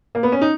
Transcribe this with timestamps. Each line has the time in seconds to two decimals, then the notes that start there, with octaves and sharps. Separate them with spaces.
0.15 A#3
0.23 B3
0.32 C#4
0.41 D#4